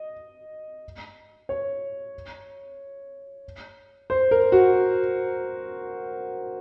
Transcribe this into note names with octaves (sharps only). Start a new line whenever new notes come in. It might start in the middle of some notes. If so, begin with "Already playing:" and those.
Already playing: D#5
C#5
C5
A#4
F#4